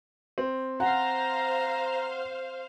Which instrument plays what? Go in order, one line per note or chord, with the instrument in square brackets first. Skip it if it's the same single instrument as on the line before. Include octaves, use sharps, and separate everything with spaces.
[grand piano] C4
[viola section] C5 F5 [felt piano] F#5 [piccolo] A#5